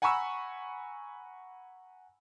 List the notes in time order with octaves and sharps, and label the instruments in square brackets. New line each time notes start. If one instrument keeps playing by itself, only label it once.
[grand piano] F#5 G#5 A#5 B5 C#6 E6